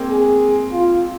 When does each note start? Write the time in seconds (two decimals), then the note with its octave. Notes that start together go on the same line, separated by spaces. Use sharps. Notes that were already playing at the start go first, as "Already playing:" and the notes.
Already playing: G#3 A#3 C4
0.09 G#4
0.72 F4